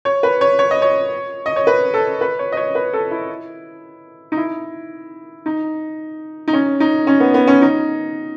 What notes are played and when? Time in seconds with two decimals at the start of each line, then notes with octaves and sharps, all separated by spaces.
0.05 C#5
0.23 B4
0.41 C#5
0.59 C#5
0.71 D#5
0.82 C#5
1.46 D#5
1.56 C#5
1.67 B4
1.94 A4
2.21 B4
2.39 C#5
2.52 D#5
2.57 C#5
2.75 B4
2.93 A4
3.11 E4
4.32 D#4
4.37 E4
5.46 D#4
6.48 D#4
6.53 C#4
6.80 D#4
7.07 C#4
7.20 B3
7.34 B3
7.47 C#4
7.62 D#4